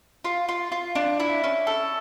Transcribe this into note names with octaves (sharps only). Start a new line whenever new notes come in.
F4
F4
F4
D4
E4
C#4
A4